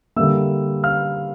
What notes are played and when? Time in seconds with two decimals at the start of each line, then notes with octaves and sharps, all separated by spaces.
0.16 D3 G3 A#3 E5 E6
0.83 F5 F6